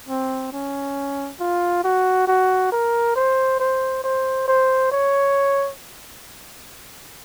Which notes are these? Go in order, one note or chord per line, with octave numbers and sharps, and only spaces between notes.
C4
C#4
F4
F#4
F#4
A#4
C5
C5
C5
C5
C#5